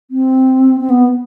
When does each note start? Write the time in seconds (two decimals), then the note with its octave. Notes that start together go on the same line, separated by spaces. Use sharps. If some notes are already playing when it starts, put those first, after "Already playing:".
0.11 C4
0.81 C4
0.90 B3